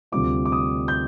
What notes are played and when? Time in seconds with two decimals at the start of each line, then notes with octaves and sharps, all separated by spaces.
0.12 D2 C3 G3 C4 F4 D6
0.45 D6
0.52 D#6
0.88 G6